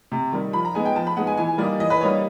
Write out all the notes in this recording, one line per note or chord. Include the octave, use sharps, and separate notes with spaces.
C3
D#3 G3
F3 B5
A#5
G#3 B3 D#4 G#5
G5
F3 A5
B5
G#3 B3 D#4 F#5
G#5
E3 G#5
G3 A#3 D#4 D5
E3 D#5
B4
G3 A#3 D#4 C#5